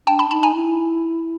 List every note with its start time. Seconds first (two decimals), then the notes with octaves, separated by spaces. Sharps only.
0.07 D4 G5 A5
0.19 A5 B5
0.30 D#4 A5 B5
0.43 G#5 A#5
0.55 E4